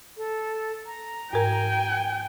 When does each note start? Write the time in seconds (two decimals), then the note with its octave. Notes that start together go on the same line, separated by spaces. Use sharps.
0.17 A4
0.87 A#5
1.33 G#2 A#4 G5 G#5